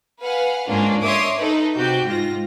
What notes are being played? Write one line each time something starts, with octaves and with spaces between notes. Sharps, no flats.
B4 F5 F#5 G#5
G#2 A#3 C#4 D4 F4
C#5 D#5 E5 C6 D6 D#6
D#4 A4 B4 D#5
C3 F#4 G4 G6
G#2 F4 A#6